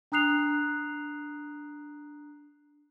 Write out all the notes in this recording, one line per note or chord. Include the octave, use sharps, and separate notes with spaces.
D4 A#5 D#6 F#6 C7 F7